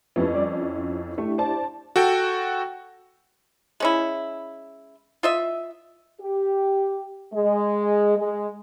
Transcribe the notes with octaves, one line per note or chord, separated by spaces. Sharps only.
F2 F3 C#4 E4 G4 B4
G3 D5
E4
A3 D4 E4 G4
C5 D5 A5
F#4 A4 G5
G#3 C#4 E4
F4 D#5 E5
G4
G#3
G#3